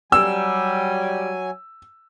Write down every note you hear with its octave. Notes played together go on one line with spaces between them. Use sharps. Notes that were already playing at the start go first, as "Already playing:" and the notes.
F#3 G3 G#5 E6